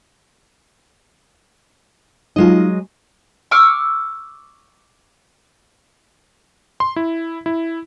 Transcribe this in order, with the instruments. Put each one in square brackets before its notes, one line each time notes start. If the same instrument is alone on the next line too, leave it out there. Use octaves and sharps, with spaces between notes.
[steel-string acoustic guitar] F#3 G#3 D#5 [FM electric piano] D#4 F4
[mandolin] C#6 D6 E6 F6
[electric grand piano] C6
E4
E4